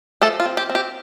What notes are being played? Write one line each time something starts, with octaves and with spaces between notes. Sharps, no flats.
F3 A3 A4
F4
C4
G4
C4
G4